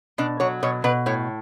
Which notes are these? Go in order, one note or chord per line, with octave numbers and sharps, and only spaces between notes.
B2 D4
F#3 C#5
B2 C#5
B2 B4
A2 C#5